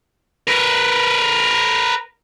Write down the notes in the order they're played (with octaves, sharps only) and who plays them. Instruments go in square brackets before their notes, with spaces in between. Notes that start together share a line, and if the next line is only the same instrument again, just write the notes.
[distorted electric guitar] A#4 B4